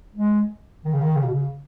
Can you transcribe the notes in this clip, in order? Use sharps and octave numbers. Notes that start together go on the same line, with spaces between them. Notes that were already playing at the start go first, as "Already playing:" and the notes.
G#3
D#3
C#3
D#3
C#3
B2
C#3